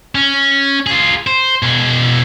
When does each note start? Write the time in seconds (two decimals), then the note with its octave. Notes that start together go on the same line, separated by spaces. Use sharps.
0.15 C#4
0.87 F4 G#4
1.27 C5
1.62 B2 G#4